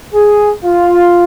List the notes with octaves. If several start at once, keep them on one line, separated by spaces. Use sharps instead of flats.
G#4
F4